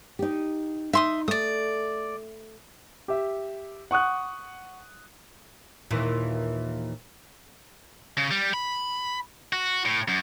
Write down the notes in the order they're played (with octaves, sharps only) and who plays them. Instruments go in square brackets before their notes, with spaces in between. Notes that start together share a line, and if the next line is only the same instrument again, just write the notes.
[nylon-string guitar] D#4 G4
[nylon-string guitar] D#4 [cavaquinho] E5 C6 D#6
[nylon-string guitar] A3 [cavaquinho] D5 D#6
[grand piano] G4 E5
F#5 C#6 D#6 F#6
[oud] D#2 A#2 E3
[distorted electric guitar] C#3
G3
B5
F#4
A2
F#2